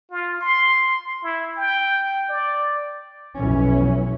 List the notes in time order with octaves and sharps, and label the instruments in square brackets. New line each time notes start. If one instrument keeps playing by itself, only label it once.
[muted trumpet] F4
C6
E4
G5
D5
[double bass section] B1 F2 E3 C#4